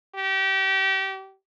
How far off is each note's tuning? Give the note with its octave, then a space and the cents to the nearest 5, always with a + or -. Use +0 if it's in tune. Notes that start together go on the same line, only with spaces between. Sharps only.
G4 -30